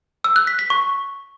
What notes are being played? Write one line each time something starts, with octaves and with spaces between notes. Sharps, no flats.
E6
F#6
B6
B6
C#6